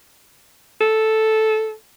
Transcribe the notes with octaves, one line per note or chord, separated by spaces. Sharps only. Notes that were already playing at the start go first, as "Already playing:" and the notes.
A4